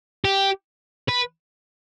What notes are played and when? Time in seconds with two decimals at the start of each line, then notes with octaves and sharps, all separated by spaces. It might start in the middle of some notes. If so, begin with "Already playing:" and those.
0.24 G4
1.08 B4